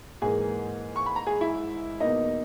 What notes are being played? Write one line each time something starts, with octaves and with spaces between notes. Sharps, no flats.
G#2 E3 A#3 G#4 G#5
C#6
B5
A#5
G#4 G#5
E4 E5
E2 B2 A#3 D#4 D#5